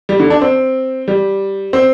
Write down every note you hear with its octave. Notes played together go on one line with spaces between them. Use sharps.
G3
D3
D4
C4
G3
C4